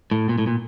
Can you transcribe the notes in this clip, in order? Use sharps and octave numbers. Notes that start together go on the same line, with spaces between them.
A2
A#2
A2
A#2